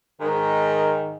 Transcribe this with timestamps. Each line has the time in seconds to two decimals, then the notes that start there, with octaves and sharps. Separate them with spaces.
0.20 G#2 D#3